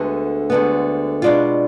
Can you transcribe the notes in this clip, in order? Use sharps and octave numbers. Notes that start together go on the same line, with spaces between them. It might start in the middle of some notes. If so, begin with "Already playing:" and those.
Already playing: D2 D3 G#3 B3
D2 D3 G#3 B3
B2 G#3 D4 F4